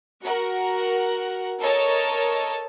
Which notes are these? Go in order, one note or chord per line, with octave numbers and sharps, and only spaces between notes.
F#4 A#4 F#5
A4 A#4 C#5 D#5 A5